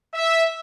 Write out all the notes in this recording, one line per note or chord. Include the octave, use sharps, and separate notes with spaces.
E5